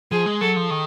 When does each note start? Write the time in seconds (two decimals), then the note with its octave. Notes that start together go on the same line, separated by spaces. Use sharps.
0.12 F3 G#4
0.26 G#3
0.41 F#3 A4
0.56 F3
0.70 D#3